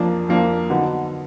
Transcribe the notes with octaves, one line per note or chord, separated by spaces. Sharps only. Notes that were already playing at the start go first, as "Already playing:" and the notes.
Already playing: F2 F3 A#3 D4
F2 F3 A#3 D4
D3 F#3 B3 D#4